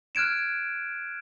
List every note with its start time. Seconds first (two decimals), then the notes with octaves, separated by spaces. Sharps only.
0.15 F6 F#6 G#6 D7 E7